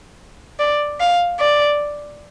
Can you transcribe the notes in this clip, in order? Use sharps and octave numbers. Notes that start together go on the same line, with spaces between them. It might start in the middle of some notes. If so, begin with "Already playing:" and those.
D5
F5
D5